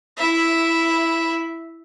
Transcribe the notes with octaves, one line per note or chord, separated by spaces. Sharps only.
E4 E5